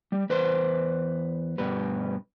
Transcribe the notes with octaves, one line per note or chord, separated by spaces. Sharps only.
G3
E2 B4 C5 C6
G2 B2 B4